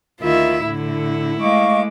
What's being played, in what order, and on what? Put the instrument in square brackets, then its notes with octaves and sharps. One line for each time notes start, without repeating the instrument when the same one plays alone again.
[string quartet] D2 D#3 E4 [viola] F4 E5
[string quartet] A2 D3 [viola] E4
[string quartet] G#3 A3 D6 [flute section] D#5 F5 C#6